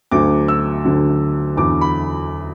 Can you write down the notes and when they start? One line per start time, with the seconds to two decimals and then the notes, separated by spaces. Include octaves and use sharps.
0.11 D2 D3 F#3 D6
0.48 E6
0.84 D2 D3 F#3
1.57 E2 D3 F#3 D6
1.81 B5